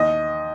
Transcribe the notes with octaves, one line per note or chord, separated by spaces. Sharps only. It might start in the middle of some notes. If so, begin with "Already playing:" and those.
Already playing: D#2 D#5